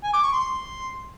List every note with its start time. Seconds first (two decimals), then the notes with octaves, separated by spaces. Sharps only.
0.04 G#5
0.13 D6
0.23 C#6
0.33 C6